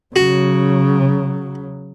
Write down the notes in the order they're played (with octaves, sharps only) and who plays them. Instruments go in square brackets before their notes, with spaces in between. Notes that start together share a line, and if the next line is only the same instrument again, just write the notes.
[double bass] C#3 [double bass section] F#3 [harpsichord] F#4